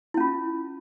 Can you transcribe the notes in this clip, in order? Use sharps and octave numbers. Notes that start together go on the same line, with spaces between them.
C#4 E4 F4